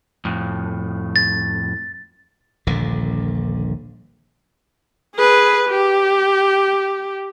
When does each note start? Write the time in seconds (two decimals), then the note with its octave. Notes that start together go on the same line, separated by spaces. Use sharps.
0.25 F2 A2
1.16 A6
2.67 D#1 A#1 A#2 D3
5.15 G#4 B4
5.69 G4